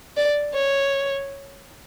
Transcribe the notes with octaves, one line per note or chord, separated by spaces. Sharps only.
D5
C#5